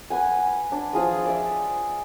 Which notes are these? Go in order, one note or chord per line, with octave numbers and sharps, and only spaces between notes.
B4 F#5 G#5
D4
F3 F4 G#4 D#6
D5 E5